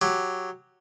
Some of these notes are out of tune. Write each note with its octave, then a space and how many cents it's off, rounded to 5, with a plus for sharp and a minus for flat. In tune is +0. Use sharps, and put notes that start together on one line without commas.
F#3 -5 G4 +0